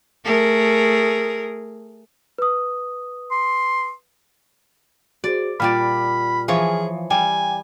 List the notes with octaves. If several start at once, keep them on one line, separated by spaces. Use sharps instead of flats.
A3 G#4 A#4
B4 D#6
C6
F#4 G#4 C5 D5
A#2 G3 F4 D5 B5 F6
E3 F3 G#4 C#5
G3 G5 G#5